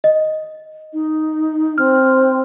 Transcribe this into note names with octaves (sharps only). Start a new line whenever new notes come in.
D#5
D#4
C4 F6